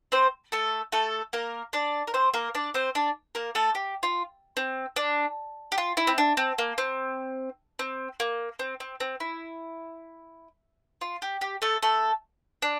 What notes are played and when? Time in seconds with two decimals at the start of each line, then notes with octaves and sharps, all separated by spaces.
0.12 C4 C5
0.52 A3 A4
0.92 A3 A4
1.33 A#3 A#4
1.73 D4 D5
2.07 A#4
2.14 C4 C5
2.34 A#3 A#4
2.55 D4 D5
2.74 C4 C5
2.95 D4 D5
3.35 A#3 A#4
3.55 A3 A4
3.75 G4
4.03 F4
4.57 C4
4.96 D4
5.72 G4
5.78 F4
5.97 E4
6.07 C4
6.18 D4
6.37 C4
6.58 A#3
6.78 C4
7.79 C4
8.20 A#3
8.59 C4
8.80 C4
9.00 C4
9.20 E4
11.01 F4
11.22 G4
11.41 G4
11.62 A3 A4
11.82 A3 A4
12.62 D4